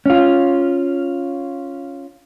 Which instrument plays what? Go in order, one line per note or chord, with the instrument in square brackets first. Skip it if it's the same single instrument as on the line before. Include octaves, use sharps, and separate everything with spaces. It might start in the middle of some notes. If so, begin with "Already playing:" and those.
[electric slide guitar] C#4 F4